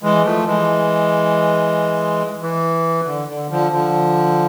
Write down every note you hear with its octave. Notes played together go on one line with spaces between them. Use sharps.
E3 G#3
F3 A3
E3 G#3
E3
D3
D3
D3 F3
D3 F3